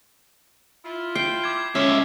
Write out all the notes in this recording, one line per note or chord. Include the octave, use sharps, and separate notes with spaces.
E4 F4
G5 C7
D6 G#6
C#2 C#4 A4 C5 C#5 E5